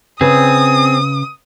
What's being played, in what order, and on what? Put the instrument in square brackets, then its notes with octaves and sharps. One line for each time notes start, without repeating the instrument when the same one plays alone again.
[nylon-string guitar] C#3 B4 [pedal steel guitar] C4 G#4 [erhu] D#6